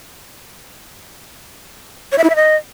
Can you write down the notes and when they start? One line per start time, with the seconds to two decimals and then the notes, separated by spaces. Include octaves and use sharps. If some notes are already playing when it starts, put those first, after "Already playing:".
2.12 C#5
2.18 E5
2.24 E4
2.30 E5
2.36 D#5